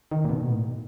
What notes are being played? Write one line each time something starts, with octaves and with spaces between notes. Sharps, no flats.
D#3
A#2
B2
A2